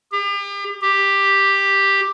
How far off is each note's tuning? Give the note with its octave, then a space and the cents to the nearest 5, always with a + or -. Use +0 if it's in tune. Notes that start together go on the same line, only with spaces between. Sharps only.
G4 +40
G4 +5